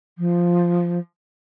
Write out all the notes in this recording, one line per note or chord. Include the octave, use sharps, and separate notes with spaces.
F3